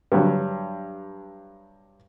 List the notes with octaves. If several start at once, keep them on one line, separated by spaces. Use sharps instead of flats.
G2 F#3